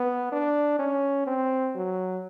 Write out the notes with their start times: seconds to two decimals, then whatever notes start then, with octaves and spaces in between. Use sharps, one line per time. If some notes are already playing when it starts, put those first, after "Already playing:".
Already playing: B3
0.32 D4
0.79 C#4
1.27 C4
1.75 F#3